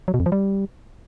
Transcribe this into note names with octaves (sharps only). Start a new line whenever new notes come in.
F#3
B2
F2
F3
G3